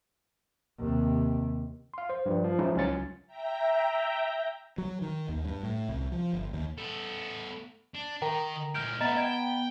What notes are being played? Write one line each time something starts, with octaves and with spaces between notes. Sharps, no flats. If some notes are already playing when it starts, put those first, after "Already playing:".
D#2 C3
F5 C6
C5
G2 F3 G3
F3
F3 F#3 G#3 C#4 D#4 E4
C#2 F#3 C#4 F4 A6 C#7
E5 G5 A#5
F#3
D#3
D#2
G2
A2
C2
F3
G1
D#2
B3 A4
D4
D#3 A#4 G5 A#5
A#2 G#3 F6 G6 D7
A3 B3 C#4 D#5 A#5 A6
D#5 G5 G#6 D7